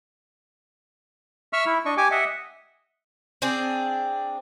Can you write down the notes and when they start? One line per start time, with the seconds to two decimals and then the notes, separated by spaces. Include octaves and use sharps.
1.53 E5 C#6 E6 F6
1.66 E4
1.85 D4 D#5 C#6
1.97 G4 G#5 D6
2.11 D#5 E5 F#5
3.42 C4 D4 G#4